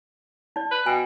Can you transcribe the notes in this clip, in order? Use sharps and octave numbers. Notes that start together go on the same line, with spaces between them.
D#4 D5
B4
B2 G5 G#5